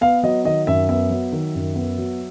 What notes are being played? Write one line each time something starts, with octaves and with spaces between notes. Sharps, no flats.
B3 F5
F#3 D#5
D#3 D#5
F#2 E5
B3 E5
F#3
D#3
F#2
B3
F#3